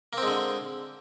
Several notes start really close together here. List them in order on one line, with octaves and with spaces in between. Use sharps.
A#3 C4 G#3 D3